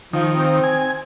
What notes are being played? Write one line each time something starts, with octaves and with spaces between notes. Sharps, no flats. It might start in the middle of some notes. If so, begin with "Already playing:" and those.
D#3 F3
C4
G#5